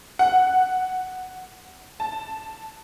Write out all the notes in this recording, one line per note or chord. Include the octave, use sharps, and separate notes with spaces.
F#5
A5